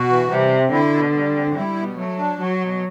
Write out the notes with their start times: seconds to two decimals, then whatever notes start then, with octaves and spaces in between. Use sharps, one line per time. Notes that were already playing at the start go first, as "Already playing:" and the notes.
Already playing: B2 F#4
0.09 E3
0.30 C3 G3
0.51 C4
0.72 D3 E4
0.92 B2
1.14 G3
1.35 C4
1.55 G3 E4
1.76 B2
1.97 F#3 A3
2.18 D4
2.39 F#3 F#4
2.60 B2